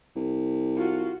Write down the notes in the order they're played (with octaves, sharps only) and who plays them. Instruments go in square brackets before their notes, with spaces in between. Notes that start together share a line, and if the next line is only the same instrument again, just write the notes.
[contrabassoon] C2
[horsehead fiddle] F4 F#4